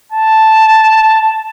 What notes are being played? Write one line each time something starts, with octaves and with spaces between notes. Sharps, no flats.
A5